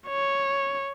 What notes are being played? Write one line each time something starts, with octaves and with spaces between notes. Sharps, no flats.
C#5